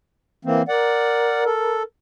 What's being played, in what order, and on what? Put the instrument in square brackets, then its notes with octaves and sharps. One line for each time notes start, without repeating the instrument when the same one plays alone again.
[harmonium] E3 A#3 C4
[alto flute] A#4 [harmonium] D5 F#5
[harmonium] A4